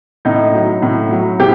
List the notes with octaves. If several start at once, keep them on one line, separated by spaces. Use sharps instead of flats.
A2 D#4
F#3
A2
F#3
A2 G4